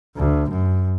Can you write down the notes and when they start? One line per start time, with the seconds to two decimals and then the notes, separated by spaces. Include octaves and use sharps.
0.16 D2
0.49 F#2